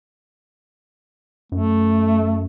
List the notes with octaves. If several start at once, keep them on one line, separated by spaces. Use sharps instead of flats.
F#2 A3